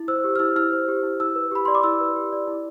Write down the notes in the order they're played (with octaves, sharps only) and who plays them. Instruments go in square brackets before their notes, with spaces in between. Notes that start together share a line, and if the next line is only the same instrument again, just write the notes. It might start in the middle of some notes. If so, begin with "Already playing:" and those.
Already playing: [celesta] E4
C5 E6
G4
F6
E4 E6
E4 F6
C5
G4
E4
E4 E6
B4
G4 B5
D5 C6
D6
E4 E6
B4
G4
D5
E4